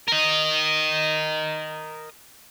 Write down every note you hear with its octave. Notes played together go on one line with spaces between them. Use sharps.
A#4 D#5